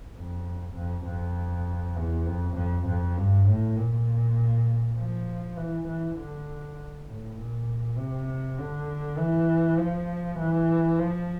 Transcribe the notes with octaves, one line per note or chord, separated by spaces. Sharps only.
F2
F2
F2
E2
F2
F2
F2
G2
A2
A#2
F3
E3
E3
D3
A2
A#2
C3
D3
E3
F3
E3
F3